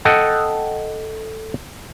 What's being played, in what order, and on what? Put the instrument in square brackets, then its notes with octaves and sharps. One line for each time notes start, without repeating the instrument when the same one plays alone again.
[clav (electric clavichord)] A4 D#5 F#5 G5